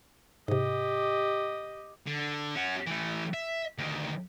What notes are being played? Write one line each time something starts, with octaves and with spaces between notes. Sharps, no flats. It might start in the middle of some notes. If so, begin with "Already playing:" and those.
G#2 C3 G4 D#5
D3
C#4 F#4
E3 A3
E5
D2 D#3